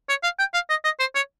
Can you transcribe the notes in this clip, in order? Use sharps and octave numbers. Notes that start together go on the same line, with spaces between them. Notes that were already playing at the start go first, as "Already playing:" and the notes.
C#5
F5
G5
F5
D#5
D#5
C5
C#5